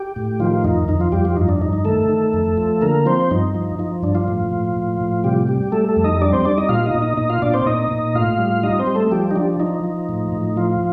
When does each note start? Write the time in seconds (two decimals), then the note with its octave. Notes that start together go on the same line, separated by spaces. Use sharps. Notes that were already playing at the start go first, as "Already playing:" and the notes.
Already playing: G4
0.16 A2
0.40 D#3 F3 F4
0.64 F2 D#4
0.88 F2 D#4
1.00 F3 F4
1.12 F2 G3 G4
1.25 F3 F4
1.36 G2 D#4
1.49 D4
1.61 G2 D#4
1.73 D#4
1.85 D#3 A3 A4
2.09 D#3
2.34 F2
2.57 F3
2.81 D3 A#3 A#4
3.06 F3 C4 C5
3.31 G2 D#4
3.55 F3
3.79 F3 D#4
4.03 G2 D4
4.15 F3 F4
4.28 A2
4.51 A2
4.76 A2
5.01 A2
5.24 C3 G3 G4
5.49 G3
5.72 G3 A3 A4
5.88 A3 A4
5.97 F2
6.04 D#4 D#5
6.22 G3 D4 D5
6.33 C4 C5
6.45 G3 D4 D5
6.58 D#4 D#5
6.69 A#2 F4 F5
6.86 D#4 D#5
6.94 A#2
7.01 D#4 D#5
7.17 A#2 D#4 D#5
7.29 F4 F5
7.42 A#2 D4 D5
7.54 C4 C5
7.61 D5
7.66 A#2 D#4 D#5
7.91 A#2
8.14 A2 F4 F5
8.39 G3
8.63 G3 D#4 D#5
8.79 C4 C5
8.87 G3
8.95 A3 A4
9.11 F3 G3 G4
9.31 D#4
9.36 F3 D4
9.60 F3 D#4
9.84 F3
10.09 A2
10.32 A2
10.56 F3 F4